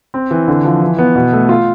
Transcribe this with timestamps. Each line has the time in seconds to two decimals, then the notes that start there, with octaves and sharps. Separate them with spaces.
0.14 C4
0.31 E3
0.48 D3
0.65 F3
0.82 E3
0.98 B3
1.16 B2
1.33 A3
1.49 F4